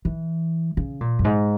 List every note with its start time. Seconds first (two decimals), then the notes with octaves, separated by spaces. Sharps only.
0.05 E3
0.77 C#3
1.01 A#2
1.19 F#2
1.25 G#2